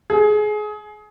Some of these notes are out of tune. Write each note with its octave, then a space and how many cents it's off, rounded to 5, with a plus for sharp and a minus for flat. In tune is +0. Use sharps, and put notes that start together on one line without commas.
G#4 +25